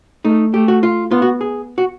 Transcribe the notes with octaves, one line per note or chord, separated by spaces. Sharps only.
A3 D#4
A3 G4
F#4
F4
B3 F4
F#4
G#4
F#4